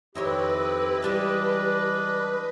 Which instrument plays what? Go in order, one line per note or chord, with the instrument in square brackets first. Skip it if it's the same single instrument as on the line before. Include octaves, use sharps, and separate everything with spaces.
[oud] F2 D#3 C#5 [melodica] C4 E4 D#5 [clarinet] G4 [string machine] B4
[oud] E3 G3 G#3 [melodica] D4 D#5